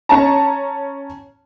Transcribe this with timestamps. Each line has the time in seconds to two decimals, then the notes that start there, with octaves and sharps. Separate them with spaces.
0.09 C#4 C#5 A5 A#5